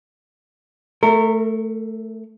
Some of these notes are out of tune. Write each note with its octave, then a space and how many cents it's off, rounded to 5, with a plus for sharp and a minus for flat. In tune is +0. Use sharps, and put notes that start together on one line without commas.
A3 +0 A#4 -30